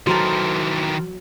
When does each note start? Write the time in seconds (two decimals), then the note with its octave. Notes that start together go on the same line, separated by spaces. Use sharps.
0.07 D#3 E3 F#3 A4 A#4 C5